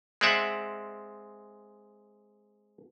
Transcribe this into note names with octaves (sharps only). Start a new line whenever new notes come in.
G#3 C4 D5 E5 F#5